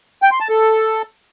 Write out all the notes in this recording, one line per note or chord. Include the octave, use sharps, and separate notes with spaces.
G5
C6
A5
A4